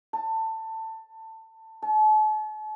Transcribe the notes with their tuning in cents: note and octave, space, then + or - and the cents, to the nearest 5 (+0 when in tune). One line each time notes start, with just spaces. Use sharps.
A5 +20
A5 -40